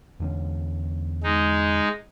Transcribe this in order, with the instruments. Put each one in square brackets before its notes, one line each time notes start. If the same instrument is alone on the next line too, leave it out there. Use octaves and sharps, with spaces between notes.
[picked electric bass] E2 D3 C#4
[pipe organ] G#3 D#4